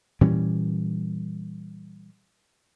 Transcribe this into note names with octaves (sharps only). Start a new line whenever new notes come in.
A#2 E3 G3 C#4